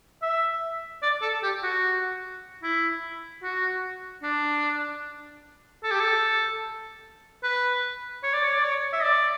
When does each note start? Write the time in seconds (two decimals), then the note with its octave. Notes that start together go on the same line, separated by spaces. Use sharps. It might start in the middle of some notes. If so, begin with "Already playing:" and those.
0.22 E5
1.02 D5
1.22 A4
1.43 G4
1.63 F#4
2.63 E4
3.43 F#4
4.23 D4
5.83 A4
5.91 G4
6.00 A4
7.43 B4
8.23 C#5
8.33 D5
8.44 C#5
8.53 D5
8.64 C#5
8.93 E5
9.03 D5